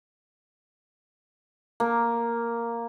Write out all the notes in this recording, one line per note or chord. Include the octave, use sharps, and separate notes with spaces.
A#3